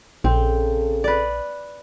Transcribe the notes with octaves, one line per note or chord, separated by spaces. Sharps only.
A#1 C#3 C4 G#4 A4
B4 D5